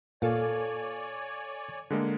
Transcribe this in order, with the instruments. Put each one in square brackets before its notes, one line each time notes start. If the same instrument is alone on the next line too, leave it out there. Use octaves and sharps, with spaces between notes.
[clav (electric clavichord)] A#2 [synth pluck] A4 F5 [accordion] C#5 D5 G#5
[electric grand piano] D3 G#3 A#3